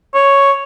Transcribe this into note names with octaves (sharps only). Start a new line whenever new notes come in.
C#5